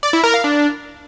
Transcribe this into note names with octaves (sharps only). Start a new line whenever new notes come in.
D5
E4
A#4
F5
D4